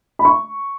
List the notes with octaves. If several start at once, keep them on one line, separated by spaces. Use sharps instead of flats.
B5
C#6